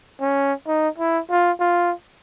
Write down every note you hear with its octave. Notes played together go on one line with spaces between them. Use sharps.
C#4
D#4
E4
F4
F4